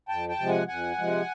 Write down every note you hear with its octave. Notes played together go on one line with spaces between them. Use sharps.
F2 G5 A5
G5 A5
C3 F3 G#3
F#5 G#5
F2 F#5 G#5
C3 F3 G#3